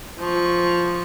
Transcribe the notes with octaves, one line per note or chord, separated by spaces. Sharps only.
F3 C#6